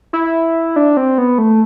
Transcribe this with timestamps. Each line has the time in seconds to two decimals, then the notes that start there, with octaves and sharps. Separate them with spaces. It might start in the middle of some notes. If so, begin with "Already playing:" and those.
0.13 E4
0.76 D4
0.97 C4
1.18 B3
1.38 A3